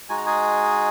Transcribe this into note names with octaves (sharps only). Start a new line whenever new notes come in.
G#3 D#4 F#4 G#5
A#5
G#4 G#5